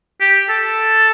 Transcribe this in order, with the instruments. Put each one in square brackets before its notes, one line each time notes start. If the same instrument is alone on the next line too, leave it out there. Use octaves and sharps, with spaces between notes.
[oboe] G4
A4